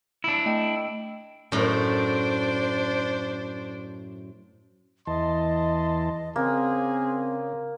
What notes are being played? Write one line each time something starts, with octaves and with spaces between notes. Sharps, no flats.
D4 E4
A3 D#5 G5
F#2 A2 D4 C5
E2 E3 D#5 A5 C6
C#3 A#3 C4 G#4